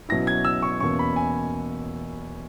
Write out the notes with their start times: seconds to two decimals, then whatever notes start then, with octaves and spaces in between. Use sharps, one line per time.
0.09 B2 F#3 C#4 E4 A#6
0.27 G#6
0.45 E6
0.62 C#6
0.80 E2 B2 A#3 C#4 C#6
0.99 B5
1.16 G#5